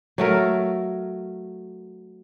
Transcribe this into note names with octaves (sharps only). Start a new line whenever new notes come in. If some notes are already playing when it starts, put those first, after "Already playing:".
F#3 A3 A#4